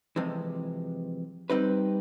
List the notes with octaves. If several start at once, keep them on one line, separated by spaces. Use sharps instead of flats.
F2 C3 E3 G#3
G3 C4 D#4 G4 B4